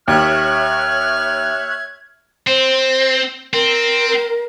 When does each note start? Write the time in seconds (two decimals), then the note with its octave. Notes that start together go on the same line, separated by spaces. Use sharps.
0.08 D#2 C#5 E5 F6 F#6 G#6
2.47 C4 C5
3.54 C4 A#4